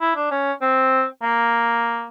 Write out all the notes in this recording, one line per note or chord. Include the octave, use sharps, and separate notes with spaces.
E4
D4
C#4
C4
A#3